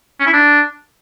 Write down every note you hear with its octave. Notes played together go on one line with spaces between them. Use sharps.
C#4
E4
D4